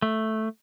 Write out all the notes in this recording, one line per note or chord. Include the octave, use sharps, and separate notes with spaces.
A3